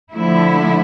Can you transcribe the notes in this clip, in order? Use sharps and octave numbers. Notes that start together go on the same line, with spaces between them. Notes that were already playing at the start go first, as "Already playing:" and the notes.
D3 F3 A3 E4